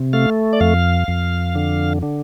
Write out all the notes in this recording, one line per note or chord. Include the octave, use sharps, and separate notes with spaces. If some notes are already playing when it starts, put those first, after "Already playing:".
Already playing: C3
A3 F5
D5
F2 F5
F2
D3
D3